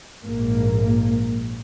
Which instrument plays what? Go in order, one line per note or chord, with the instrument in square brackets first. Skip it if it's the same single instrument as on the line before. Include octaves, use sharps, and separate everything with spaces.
[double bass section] A#1 G#2 A#3